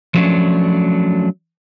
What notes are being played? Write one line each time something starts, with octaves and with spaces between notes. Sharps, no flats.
F3 F#3 A3 C#4 D4